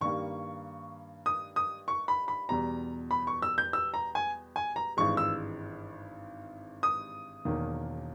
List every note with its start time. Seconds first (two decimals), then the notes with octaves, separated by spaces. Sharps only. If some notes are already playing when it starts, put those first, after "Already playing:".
0.01 G2 D#3 G3 A#3 C#6
1.26 D#6
1.56 D#6
1.88 C#6
2.08 B5
2.28 B5
2.49 E2 B2 G3 A#5
3.11 B5
3.27 C#6
3.42 E6
3.58 G6
3.73 E6
3.94 A#5
4.15 G#5
4.56 G#5
4.76 A#5
4.97 G#1 G2 E3 G#3 C#6
5.17 E6
6.83 D#6
7.45 E1 E2 D#3 A#3